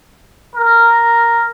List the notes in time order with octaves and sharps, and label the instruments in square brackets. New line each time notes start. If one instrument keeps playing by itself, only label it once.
[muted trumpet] A#4